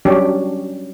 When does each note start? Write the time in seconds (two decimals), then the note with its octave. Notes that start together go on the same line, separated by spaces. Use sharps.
0.05 F#3 G3 C#4 D4 G4